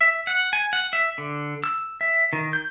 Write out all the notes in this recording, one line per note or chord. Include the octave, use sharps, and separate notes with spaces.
E5
F#5
G#5
F#5
E5
D3
E6
E5
D#3
G6